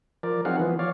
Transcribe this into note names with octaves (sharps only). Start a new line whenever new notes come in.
F3 A#4 D5
F#3 C4 D#4 G#4 F5 F#5
E3 F3 B3
C#5 D5 F5